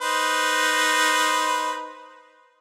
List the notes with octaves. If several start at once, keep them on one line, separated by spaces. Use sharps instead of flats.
D#4 B4 C5